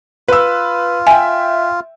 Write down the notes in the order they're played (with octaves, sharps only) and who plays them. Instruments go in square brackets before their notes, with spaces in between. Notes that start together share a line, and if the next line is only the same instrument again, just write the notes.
[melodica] F4 [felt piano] B4 E6
[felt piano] E5 G5 [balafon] G#5